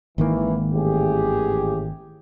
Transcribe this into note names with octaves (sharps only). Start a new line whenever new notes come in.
G#1 D#3 E3 A#3
A1 G4 G#4